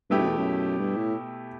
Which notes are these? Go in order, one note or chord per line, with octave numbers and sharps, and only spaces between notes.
G2 B2 A3 E4 G4
F#2
E2
F#2
G2
A2